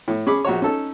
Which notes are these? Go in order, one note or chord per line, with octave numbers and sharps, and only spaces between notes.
A2
C#4 G#4 B5 D6
A#1 F#4 C#5
C#4 D#4 A4